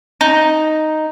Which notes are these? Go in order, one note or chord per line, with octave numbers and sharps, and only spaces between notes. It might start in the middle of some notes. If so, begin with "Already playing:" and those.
D#4